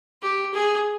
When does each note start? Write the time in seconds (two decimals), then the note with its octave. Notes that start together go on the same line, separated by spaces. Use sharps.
0.22 G4
0.54 G#4